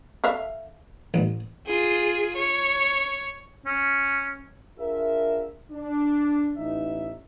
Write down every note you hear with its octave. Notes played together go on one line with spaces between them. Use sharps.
A4 E5 F5
A1
F4 G#4
C#5
C#4
D4 F4 G#4 A#4 E5
D4
A1 D#4 E5